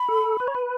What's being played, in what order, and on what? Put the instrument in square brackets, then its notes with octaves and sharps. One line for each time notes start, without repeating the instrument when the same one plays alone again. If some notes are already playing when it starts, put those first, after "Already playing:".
Already playing: [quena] B5
[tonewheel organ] A4
B4
C#5
B4